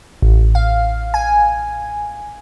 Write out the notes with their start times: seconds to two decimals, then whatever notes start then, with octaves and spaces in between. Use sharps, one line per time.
0.22 A1
0.55 F5
1.14 G#5